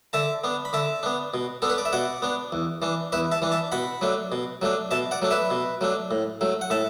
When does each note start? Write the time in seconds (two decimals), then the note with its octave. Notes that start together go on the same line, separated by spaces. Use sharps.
0.13 D3 E5 A5
0.44 B3 D4
0.65 B5
0.73 D3 E5 A5
1.03 B3 D4
1.34 B2
1.62 B3 D4 A4
1.70 B4
1.78 D5
1.85 E5
1.93 B2 D5 F#5
2.22 B3 D4
2.52 E2
2.82 E3 D4
3.12 E2 B4 E5
3.32 E5 A5
3.42 E3 D4
3.51 E5 A5
3.72 B2 F#5 B5
4.01 F#3 A3 D4
4.32 B2
4.62 F#3 A3 D4
4.91 B2 E5 A5
5.11 D5 F#5
5.22 F#3 A3 D4
5.31 B4 E5
5.51 B2
5.81 F#3 A3 D4
6.11 A2
6.41 F#3 A3
6.61 F#5
6.70 A2 E5 A5